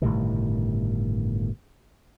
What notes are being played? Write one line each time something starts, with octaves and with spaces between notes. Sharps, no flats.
G1 A2 C3 D#3